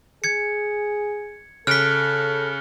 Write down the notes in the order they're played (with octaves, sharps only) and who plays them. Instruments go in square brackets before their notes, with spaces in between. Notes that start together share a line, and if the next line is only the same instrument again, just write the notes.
[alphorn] G#4 [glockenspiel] G#6 C#7
[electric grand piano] C#3 D7 [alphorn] A4 [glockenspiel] F6 B6 [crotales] F#6 C#7 G7